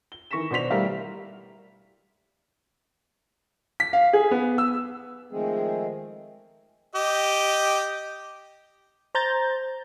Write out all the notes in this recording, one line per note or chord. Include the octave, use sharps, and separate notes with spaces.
G7
D#3 E3 C#6 A#6 B6 E7
B2 D4 C5 C6 B6 F7
G3 A3 E4 G4 A#4 F5
B6
F5
G#4
B3
E6
D#3 F3 G#3 A3 C4 G#4
G4 D#5
C5 A#5 G6 A6